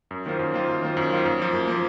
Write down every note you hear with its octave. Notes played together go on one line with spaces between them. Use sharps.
F#2
D#3 A#3 F4 C5
F#2
D#3 A#3 F4 C5
F#2
D#3 A#3 F4 C5
F#2
D#3 A#3 F4 C5
F#2
F3 A#3
F#2
F3 A#3